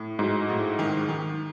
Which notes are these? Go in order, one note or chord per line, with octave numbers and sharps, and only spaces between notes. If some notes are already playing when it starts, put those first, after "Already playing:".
Already playing: A2
G#2 F#3
A2
D#3
D#3